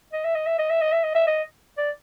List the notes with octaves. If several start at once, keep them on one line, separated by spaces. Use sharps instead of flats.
D#5
E5
D#5
E5
D#5
E5
D#5
E5
D#5
E5
D#5
D5